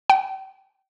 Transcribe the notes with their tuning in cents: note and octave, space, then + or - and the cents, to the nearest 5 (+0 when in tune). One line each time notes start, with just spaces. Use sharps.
G5 -30